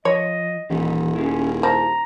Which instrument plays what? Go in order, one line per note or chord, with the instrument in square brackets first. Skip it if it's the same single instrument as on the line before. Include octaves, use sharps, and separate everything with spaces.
[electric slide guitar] F3 [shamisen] C#5 [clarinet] D#5
[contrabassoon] D#1 [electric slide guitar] E3 G4
[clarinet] C#4 [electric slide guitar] E4 G4 G#4
[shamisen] F3 [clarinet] A#5